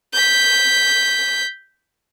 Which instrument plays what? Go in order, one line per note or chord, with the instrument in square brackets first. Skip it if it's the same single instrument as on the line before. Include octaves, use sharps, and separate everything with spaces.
[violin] G6 B6